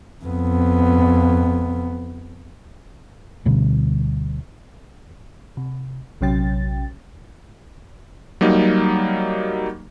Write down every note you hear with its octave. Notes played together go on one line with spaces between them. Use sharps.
F2 B3
D2 B2 D3 G3
C3
A#1 C3 F#3 C#4 G5 A6
F#3 G3 A#3 D#4